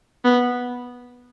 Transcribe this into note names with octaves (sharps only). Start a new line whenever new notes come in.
B3